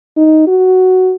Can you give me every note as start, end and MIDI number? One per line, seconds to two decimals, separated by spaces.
0.17 0.44 63
0.48 1.15 66